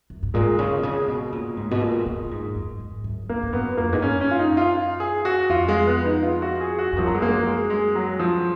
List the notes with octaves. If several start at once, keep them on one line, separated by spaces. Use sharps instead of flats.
F#2
G#2
A#2 G#3
C#3
B2
C#3
B2
A#2
G#2
B2
A#2
A#2
A#2
G#2
F#2
G#2
F#2
F#2 A#3
G#2
F#2 B3
F2 A#3
G#2
F#2 C#4
C#4
F4
D#4
F4
G#4
F#4
F2 F4
G#3
B3
D#4
F4
F#4
G#4
F#4
F2
F#2 F3
F#3
G#3
A#3
G#3
G#3
F#3
F3